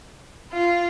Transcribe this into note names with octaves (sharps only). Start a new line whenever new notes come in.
F4